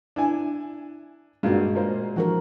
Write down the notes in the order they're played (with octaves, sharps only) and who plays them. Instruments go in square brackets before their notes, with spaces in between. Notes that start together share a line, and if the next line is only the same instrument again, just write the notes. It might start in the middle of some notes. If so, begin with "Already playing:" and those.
[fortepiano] D4 E4 G#5
[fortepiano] G2 A#2 [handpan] G#3 F#4
[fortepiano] A#2 A#3 C5
[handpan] E3 F3 A#4 [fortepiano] D4 F#4